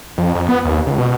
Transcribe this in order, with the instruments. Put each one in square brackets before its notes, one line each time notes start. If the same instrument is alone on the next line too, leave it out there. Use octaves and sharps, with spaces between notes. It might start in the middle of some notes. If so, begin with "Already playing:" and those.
[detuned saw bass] F2
F2
B3
D#2
C#2
B2